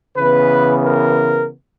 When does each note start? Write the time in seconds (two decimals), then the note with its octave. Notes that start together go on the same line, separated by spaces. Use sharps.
0.16 C#3 E3 B3 B4
0.84 A#4